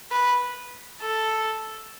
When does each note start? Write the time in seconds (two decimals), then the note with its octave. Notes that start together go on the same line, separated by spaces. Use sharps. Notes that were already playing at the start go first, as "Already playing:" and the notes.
0.11 B4
1.01 A4